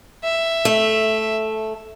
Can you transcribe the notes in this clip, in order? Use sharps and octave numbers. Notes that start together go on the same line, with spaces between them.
E5
A3